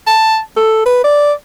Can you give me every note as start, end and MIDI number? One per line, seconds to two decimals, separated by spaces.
0.07 0.39 81
0.57 0.82 69
0.86 1.04 71
1.04 1.32 74